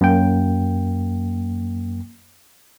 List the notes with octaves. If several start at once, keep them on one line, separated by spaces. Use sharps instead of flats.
F#2 A#3 G5